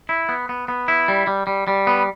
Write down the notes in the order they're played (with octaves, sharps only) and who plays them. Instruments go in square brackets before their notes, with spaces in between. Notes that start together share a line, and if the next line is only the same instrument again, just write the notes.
[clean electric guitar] E4
B3
B3
B3
E4
G3
G3
G3
G3
B3